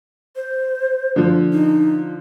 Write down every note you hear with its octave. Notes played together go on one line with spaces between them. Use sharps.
C5
D3 F3
D#4